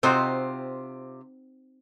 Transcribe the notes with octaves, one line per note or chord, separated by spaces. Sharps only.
C3 C4 D#4 F4 F#4 C5